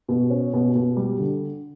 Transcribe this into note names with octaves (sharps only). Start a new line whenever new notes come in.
B2
C#4
B2
B2
G3
D3